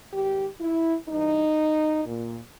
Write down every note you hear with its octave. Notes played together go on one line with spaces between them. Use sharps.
G#2 D#3 G4
E4
G2 E3 D#4
A#2